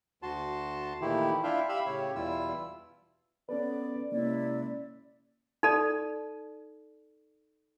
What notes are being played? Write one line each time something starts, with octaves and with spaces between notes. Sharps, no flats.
D2 F#4 A5 C6
A#2 D#3 E3 A3 E4 G4
D4 E4 F4 E5 F5 G5
G4 E5 F5 B5 E6
A2 C#3 G4 C#5
E2 B2 G3 E4 F4 E6
B3 C#4 A4 B4 D5
C3 G#3 A#3 C#4 E4 D5
D#4 A4 D5